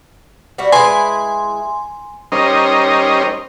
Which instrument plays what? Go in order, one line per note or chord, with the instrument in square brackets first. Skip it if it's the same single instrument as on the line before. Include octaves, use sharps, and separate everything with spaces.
[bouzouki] G3 F#4 E5
[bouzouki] G#3 E4 B4 [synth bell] G#5 C6
[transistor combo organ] G3 C#4 D#4 A#4 C5 D#5